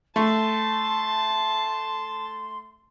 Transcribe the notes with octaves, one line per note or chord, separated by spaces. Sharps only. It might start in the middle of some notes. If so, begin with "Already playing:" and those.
A3 A5 C6